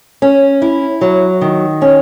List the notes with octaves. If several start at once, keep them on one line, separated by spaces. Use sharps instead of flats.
C#4
E4
F#3
D#3
C#4